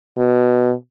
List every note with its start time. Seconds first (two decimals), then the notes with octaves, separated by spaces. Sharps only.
0.17 B2